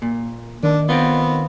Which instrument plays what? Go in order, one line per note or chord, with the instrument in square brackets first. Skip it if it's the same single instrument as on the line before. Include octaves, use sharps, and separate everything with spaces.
[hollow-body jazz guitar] A#2
[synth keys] D#3 [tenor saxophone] D4
[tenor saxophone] B3 [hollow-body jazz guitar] C4 F4